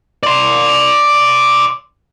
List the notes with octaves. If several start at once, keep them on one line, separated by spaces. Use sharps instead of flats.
D5 C6